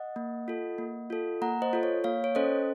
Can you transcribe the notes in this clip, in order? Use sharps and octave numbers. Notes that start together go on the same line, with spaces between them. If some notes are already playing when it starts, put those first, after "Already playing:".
Already playing: D#5 F#5
A#3
F4 A4
A#3
F4 A4
A#3 F#5 A#5
C5 D#5
F4 A4
C#5
A#3 C#5 F5
C#5
C#4 A4 C5 D#5